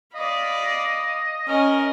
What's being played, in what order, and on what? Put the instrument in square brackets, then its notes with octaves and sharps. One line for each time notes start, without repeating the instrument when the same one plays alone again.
[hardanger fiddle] D5 B5 [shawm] D#5 [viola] F5
[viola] C#4 [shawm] A#4 [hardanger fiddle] D#5